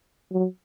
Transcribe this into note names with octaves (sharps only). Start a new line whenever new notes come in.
F#3